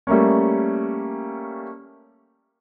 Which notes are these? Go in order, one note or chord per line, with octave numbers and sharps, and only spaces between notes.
G3 A3 A#3 C#4